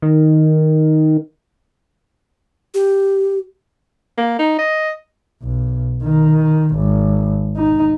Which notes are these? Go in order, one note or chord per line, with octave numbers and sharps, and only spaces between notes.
D#3
G4
A#3
D#4
D#5
B1
D#3
G#1
D#4